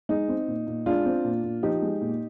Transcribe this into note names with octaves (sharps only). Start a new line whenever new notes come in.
G#3 D#4
C4
A#2
A#2
G#3 D4 F4
C4
A#2
A#2
F3 D#4 G4
G#3
A#2